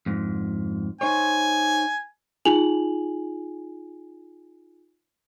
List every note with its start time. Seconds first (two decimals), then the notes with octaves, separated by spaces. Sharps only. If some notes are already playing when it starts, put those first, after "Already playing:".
0.06 F2 G#2
1.01 D#4 C5 C#5 G#5
2.45 D#4 F4 G#4 G#5 F7 F#7